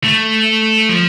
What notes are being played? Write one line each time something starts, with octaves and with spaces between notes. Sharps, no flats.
A3
F3